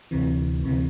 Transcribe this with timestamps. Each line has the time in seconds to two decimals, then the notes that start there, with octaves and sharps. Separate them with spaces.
0.11 D2 C3 E3
0.64 D2 C3 E3